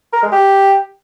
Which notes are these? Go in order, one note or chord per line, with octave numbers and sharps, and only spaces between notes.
A#4
G#3
G4